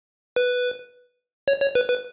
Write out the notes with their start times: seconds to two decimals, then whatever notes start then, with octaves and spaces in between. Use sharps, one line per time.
0.36 B4
1.48 C#5
1.61 C#5
1.75 B4
1.89 B4